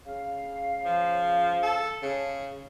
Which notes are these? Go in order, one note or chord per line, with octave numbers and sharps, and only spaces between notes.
C#3 F5
F3
A4
C#3